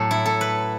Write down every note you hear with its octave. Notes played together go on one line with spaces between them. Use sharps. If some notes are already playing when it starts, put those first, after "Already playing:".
Already playing: A2 F#3 A4
E4
A4
B4